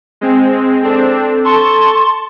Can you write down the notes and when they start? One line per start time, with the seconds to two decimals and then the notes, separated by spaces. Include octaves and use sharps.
0.21 G#3 C4
0.83 C4 D4 A4
1.45 A5 C6 C#6